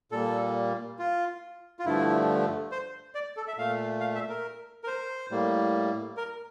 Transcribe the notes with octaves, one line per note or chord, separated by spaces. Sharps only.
A#2 G3 A#3 A4
F4
F4
G2 D3 F3 A3 E4
C5
D5
A4
E5
A#2 A3 F5
F5
E5
A#4
A#4
C5
A2 G3 A#3
A#4